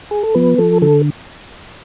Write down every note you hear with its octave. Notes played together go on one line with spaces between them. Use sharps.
G#4
A4
F3 B3 B4
F3 A4
D3 A4